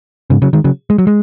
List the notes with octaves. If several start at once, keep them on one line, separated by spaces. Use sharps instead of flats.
G#2 C#3
C#3 F#3
D#3 G#3
C#3 F#3
G#3
F#3
G#3